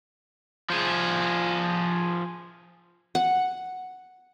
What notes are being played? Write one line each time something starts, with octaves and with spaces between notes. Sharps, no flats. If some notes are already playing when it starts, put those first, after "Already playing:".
F3 G#4
F#5